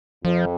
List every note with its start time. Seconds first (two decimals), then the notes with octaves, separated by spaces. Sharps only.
0.25 F2 F3